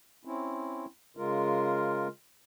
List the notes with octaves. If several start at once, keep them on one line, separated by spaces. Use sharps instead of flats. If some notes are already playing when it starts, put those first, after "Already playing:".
C4 C#4 E4
C#3 G#3 F4 A#4